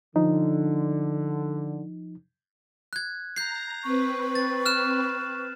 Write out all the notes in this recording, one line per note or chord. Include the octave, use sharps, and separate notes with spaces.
D3 F3 D#4
F#6 G#6
A#5 G6 A#6 C7
C4 B4 C#6
A6
F6 F#6 E7